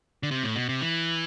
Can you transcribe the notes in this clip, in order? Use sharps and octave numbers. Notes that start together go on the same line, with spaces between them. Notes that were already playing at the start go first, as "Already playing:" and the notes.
D3
C3
A2
B2
C3
E3